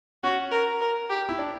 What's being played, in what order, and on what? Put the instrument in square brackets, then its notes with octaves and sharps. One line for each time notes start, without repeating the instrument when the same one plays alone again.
[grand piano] C#4 [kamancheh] F#4
[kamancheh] A#4
A#4
G4
[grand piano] E4
D4